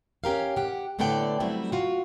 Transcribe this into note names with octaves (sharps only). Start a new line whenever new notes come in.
C#4 G4 A#4 F5
G4 F#5
A2 D3 B3 A4 D5 G5
F#3 G3 A3 C4 E4
F4 F#4